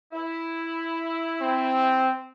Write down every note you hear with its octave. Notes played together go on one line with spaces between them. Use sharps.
E4
C4